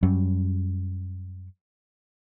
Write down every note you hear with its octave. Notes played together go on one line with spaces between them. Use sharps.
F#2 F#3 G3 C#4